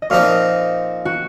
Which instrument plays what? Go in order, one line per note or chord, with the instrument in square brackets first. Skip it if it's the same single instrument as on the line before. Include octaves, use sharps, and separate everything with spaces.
[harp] D#5
[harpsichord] A#2 F3 C4 D#4 [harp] F5
[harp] F#4